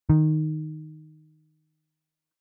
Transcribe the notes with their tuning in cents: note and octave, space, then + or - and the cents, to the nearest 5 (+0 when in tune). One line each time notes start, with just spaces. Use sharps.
D#3 -5